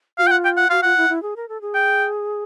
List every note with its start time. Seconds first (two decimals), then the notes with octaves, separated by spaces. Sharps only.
0.18 F#4 F5
0.22 F4 G5
0.31 F#5
0.45 G5
0.57 F#5
0.70 F#4 F5
0.83 F4 F#5
0.97 E4
1.09 E4
1.22 G#4
1.36 A#4
1.49 A4
1.61 G#4
1.75 G5